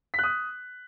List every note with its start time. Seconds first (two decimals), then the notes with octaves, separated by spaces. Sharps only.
0.14 B6
0.19 F#6
0.23 D#6